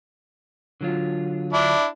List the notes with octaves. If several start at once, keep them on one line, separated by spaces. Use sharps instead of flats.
D3 F#3 F4
D4 E4